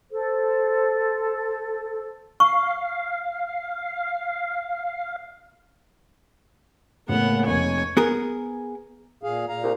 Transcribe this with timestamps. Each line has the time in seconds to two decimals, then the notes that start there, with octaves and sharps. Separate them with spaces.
0.12 A4 C5
2.40 F5 C#6
7.09 A2 C#3 A#3 B3 F#5
7.47 F1 C#5 G#5
7.97 B3 G#4 A#4
9.23 A#2 G#4 F5
9.49 A#2 F5 A#5
9.63 C2